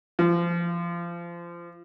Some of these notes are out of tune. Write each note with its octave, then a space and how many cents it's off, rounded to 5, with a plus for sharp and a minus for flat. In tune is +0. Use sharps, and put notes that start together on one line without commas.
F3 -25